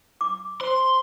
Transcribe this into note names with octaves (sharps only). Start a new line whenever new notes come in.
D6
C5 C6